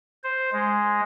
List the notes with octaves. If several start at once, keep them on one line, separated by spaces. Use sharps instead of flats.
C5
G#3